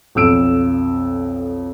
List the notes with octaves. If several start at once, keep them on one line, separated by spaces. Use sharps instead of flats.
B1 F2 E6 D7 E7